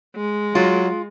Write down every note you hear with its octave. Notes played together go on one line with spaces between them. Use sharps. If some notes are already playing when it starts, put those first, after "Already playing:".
G#3
F#3 F4